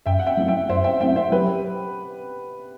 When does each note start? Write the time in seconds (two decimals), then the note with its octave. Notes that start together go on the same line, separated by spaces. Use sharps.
0.06 F#2 E5 G5
0.19 F#5
0.27 E5 G5
0.37 F#3 A3 C4 E4
0.48 E5 G5
0.69 F#2 C5 E5
0.84 E5 G5
1.00 F#3 A3 C4 E4 E5 G5
1.16 C5 E5
1.32 F#3 G4 B4